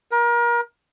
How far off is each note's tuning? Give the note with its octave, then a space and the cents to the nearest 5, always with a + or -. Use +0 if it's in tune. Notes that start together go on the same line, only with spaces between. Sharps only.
A#4 +30